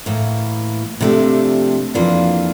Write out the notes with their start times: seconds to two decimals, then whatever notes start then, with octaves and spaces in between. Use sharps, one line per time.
0.06 A2 E3 A#3
1.01 C3 F3 A3 D4 G4
1.94 F2 E3 A#3 D4 F4